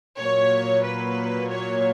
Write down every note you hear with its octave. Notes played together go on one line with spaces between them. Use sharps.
A#2 F#3 A#3 C#5
B4
C#5